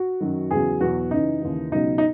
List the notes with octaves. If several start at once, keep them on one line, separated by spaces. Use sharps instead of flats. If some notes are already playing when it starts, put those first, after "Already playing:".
Already playing: F#4
F#2 D#3 F#3
E2 C#3 F#3 G#4
E2 B2 F#3 F#4
F#2 C#3 E3 D#4
D#2 C#3 E3
C#2 B2 F#3 D#4
D#4